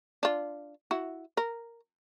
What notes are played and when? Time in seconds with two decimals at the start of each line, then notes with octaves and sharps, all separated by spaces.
0.23 D4 F4
0.91 E4 F#4
1.37 A#4